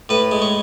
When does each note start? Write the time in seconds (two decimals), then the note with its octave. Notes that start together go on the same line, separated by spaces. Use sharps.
0.09 A2 B4
0.31 G#3
0.42 C#5